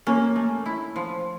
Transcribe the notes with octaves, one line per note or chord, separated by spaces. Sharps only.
A#3 C#4
A3
E4
F3